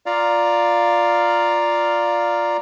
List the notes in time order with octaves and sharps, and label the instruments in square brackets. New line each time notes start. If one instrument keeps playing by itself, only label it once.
[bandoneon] F4 D5 F5 A#5